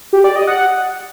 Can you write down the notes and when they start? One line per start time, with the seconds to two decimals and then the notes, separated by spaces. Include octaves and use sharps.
0.13 G4
0.24 D5
0.36 D#5
0.47 F#5